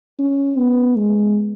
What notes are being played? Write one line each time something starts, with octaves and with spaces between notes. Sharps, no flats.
C#4
B3
G#3